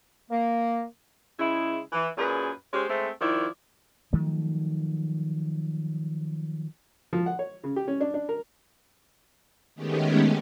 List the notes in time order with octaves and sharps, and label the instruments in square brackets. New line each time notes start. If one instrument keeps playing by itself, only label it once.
[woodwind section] A#3
[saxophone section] C#3 G#3 E4
E3
F#2 A#2 G#4 B4
G#3 C#4 G4 C5
G#3 A3 C4
D#3 F3 E4 D5
[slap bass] D#3 F3 F#3 A3
[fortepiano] F3
F#5
C#5
C#3
G4
C#4
D4
D4
A#4
[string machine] D#3 G#3 A3 B3 C#4 G4